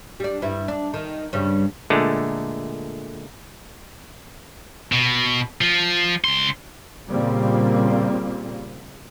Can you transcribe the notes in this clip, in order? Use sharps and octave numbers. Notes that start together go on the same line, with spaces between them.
G3 D4
G2 E4
D4
D#3
G2 C#3 G3
A#2 D3 G#3 A3
B2
F3
C#2 C6
A#2 C#3 G3 A#3 C4